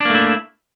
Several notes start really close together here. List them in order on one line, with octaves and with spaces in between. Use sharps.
D4 A#3 A3 E4